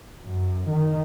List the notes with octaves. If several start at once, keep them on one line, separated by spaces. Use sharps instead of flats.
F#2
D#3